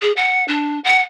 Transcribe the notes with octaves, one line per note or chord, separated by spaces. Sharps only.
G#4
F#5
D4
F#5